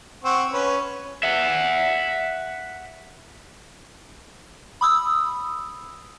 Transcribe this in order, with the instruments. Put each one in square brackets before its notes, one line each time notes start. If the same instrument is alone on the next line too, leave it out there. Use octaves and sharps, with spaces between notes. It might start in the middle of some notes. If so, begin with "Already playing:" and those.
[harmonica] C4 F#5 C#6
C#4 B4 C#5
[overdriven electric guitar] E5 F#5
[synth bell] B5 D#6 E6